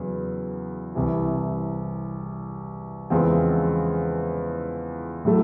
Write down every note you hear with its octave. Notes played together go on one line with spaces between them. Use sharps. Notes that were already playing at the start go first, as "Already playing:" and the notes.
Already playing: E2 C#3 F#3
C2 C3 E3
E2 C#3 F3 G#3 C4
A2 F#3 A3